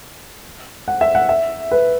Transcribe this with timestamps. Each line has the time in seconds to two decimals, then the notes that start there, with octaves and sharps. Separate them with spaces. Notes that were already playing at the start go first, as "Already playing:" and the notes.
0.88 F#5
1.01 E5
1.15 F#5
1.29 E5
1.71 B4